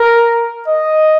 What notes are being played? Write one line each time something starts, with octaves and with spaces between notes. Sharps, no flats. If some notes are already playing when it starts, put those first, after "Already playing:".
Already playing: A#4
D#5